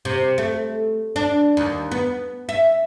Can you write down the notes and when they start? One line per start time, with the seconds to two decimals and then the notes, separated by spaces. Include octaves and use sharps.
0.05 C3
0.38 A3
1.16 D4
1.57 D#2
1.91 B3
2.49 E5